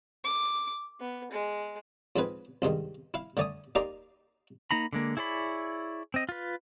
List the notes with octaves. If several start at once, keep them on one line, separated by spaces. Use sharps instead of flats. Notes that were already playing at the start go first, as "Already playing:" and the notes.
D6
B3
G#3
F2 G#2 C4 B4 G#5
C2 G2 D#3 G#3
E4 F5
D3 A3 D5 G#5 D#6
A#3 D#4 G4 D5 A#5 C6
A#3 D#4 A#5 B5
D3 G#3 A#3
E4 G#4 C#5 D5 B5
C4 D#5
F4 B4